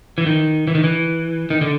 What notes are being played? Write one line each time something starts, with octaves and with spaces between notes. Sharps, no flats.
E3
D#3
E3
D#3
E3
D#3
D3